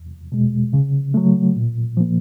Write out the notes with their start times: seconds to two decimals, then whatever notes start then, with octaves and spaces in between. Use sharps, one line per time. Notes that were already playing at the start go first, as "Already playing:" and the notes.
Already playing: E2
0.32 B2 G#3
0.73 C#3
1.14 F#3 A3
1.56 A#2
1.97 F3 A#3